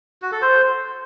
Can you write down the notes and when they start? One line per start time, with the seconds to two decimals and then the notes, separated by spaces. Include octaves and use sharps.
0.22 F#4
0.32 A4
0.42 C5